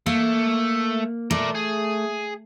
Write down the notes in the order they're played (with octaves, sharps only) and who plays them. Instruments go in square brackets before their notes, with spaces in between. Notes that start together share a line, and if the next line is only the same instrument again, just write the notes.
[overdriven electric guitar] A3 [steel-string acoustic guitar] A#3
[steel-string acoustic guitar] A3 [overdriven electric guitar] A#4 D5
[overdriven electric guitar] G#4